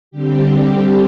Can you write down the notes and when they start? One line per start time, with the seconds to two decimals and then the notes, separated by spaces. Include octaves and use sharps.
0.11 D3 G3 C4 G4
0.48 G4